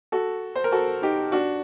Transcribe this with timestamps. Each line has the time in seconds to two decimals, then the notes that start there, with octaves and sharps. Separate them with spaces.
0.12 F#4 A4
0.56 C5
0.64 A#4
0.72 F#4 A4
1.02 D#4 G4
1.32 D4 F#4